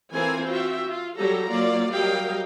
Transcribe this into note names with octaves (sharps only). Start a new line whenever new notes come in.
E3 C4 F4 A4 A#4 G#5
F4 F#4 E5 G5
F4
F#3 G3 G4 A4 A#5
F#3 A#3 F4 D5
F#3 G3 A#4 D#5 F5 G5